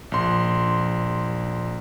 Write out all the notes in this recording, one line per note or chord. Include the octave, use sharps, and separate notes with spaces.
A#1 C6